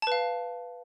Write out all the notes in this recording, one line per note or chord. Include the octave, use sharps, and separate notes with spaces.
B4 F5 A5